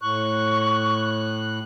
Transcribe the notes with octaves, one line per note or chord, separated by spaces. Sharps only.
A2 C#6 F#6